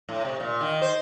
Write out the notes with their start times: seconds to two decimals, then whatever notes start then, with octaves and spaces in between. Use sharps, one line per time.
0.09 A2
0.25 C3
0.40 A#2
0.61 D#3
0.82 C5